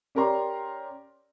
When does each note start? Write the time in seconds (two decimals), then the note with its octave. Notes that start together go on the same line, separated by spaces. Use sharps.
0.15 C#4 G4 A#4 D5 A#5 C6